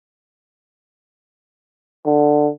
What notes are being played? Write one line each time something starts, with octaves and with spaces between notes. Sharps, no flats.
D3